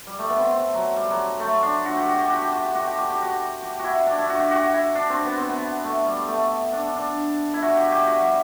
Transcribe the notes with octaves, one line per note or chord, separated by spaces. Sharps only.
G3
A3
B3
C4
C4
F#3
G3
F#3
A3
D4
F#4
G4
F#4
G4
F#4
G4
F#4
G4
F#4
G4
F#4
G4
F#4
G4
E4 F#4
D4
E4
F#4
G4
F#4
E4
D4
C4
B3
C4
B3
A3
G3
A3
D4
D4
E4
F#4
G4
G4
F#4
G3